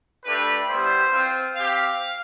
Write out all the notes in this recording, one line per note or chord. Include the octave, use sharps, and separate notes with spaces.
A3 D4 G4 B4
G3 B3 E4 C5
C4 F4
C4 G4 F5